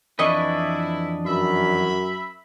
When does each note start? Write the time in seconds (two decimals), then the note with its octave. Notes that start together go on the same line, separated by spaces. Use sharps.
0.19 F2 E3 D4 E4 B4 D#5 C#6
1.26 F#2 E5 B5